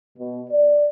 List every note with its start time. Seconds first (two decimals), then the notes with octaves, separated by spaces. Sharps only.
0.18 B2
0.51 D5